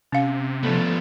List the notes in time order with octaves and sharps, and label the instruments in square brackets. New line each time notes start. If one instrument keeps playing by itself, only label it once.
[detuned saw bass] C3 [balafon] C#4 F5
[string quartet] F3 A3 [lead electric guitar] B3 D4